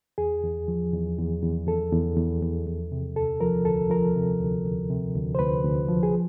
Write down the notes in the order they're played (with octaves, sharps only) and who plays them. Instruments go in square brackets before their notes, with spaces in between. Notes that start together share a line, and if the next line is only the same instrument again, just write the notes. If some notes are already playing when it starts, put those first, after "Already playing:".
[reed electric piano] E2 G#4
E2
F3
E2
E2
E2
E2 A4
E2
E2
E2
E2
C3
D2 A4
F3 A#4
D2 A4
F3 A#4
C3
D2
D2
C3
D2
C5
D2 B4
D2
F3
G#4